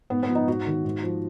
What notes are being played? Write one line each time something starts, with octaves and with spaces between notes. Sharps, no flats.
G#2 B3
B3
F3
D#4
G#2 F#4
D#3
G#2
F3